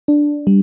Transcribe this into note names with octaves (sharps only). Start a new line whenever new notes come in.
D4
G3